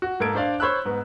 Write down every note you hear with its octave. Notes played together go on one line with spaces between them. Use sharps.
F#4
G#2 A#3 A4 G#6 D7
D4 C5 D5 F5
C5 C#5 B5 E6 F#6
G#2 B3